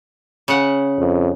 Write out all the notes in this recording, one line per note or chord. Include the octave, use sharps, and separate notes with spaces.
C#3 F#5
F2